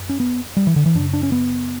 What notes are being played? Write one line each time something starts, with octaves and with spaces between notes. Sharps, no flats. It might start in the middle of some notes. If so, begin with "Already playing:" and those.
Already playing: F#2
C#4
B3
G3
E3
D3
E3
F#2 C#3 D4
D4
C#4
B3